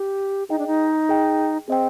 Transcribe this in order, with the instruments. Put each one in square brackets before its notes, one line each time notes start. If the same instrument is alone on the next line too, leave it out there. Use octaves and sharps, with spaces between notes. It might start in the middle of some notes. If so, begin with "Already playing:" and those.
Already playing: [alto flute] G4
[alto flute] D#4 [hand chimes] G#4 D#5 G5
[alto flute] D4
D#4
[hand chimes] G#4 D#5 G5
[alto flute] C4 [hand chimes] G#4 D#5 G5